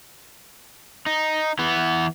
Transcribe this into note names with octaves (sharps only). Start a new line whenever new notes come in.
D#4
E3 B3